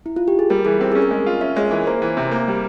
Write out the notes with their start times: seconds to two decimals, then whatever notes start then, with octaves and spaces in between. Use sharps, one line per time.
0.06 E4
0.16 F4
0.28 G4
0.39 G#4
0.50 G3 A#4
0.65 E3 G#4
0.80 C4 A#4
0.92 C#4 G#4
1.02 A#4
1.11 G#3
1.26 F4
1.41 C#4 E5
1.56 G#3 C#5
1.71 E3 A#4
1.87 A#3 C5
2.02 E3
2.17 C3
2.31 A#3
2.48 G3